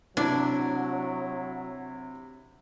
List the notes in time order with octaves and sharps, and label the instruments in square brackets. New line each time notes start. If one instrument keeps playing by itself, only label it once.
[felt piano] C3 E4 [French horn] F#3 [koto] D4